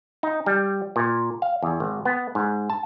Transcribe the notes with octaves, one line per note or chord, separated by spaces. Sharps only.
D#4
G3
A#2
F5
E2
G#1
B3
G#2
A5